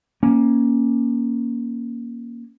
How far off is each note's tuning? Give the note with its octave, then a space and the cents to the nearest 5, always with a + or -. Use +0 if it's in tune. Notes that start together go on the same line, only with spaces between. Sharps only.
A#3 +15 C#4 +0